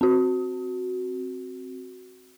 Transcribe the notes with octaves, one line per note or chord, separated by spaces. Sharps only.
C4 F#4